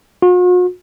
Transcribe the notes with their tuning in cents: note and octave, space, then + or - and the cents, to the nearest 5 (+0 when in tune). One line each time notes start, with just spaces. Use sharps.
F#4 -45